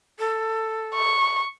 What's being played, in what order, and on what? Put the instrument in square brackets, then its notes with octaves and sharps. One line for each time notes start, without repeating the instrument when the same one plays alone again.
[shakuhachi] A4
[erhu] C#6